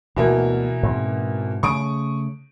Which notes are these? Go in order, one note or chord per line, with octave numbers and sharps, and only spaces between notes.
D2 B2 E3 A#3 B3
G#2 C4
C#3 A3 C#6 D#6 D7